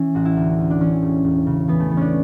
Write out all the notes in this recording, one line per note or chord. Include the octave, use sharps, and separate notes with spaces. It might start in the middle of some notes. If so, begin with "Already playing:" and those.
Already playing: E3 C#4
A1 F#4
E4
D2
D2
D4
E3 C#4
E1
E1
C#3
E3 B3
A3
E3 B3
C#4 D4